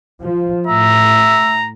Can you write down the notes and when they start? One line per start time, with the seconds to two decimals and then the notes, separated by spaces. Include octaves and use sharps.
0.22 F3
0.67 A2 E5 A#5